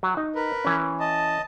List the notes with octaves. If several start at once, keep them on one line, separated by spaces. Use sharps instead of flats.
F#3
D#4
A#4 B4
E3 C#4
D#5 A5